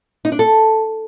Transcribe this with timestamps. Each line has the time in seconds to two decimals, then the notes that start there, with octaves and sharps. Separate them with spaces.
0.25 D#4
0.32 D4
0.39 A4